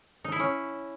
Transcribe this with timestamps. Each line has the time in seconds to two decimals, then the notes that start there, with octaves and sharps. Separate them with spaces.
0.24 D#4
0.32 E4
0.40 C#4